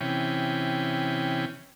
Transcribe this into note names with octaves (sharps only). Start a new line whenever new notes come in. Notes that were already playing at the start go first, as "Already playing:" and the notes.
C3 E3 C#4 G5